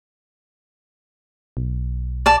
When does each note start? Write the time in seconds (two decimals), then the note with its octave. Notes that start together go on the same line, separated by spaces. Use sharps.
1.57 B1
2.26 D5 A5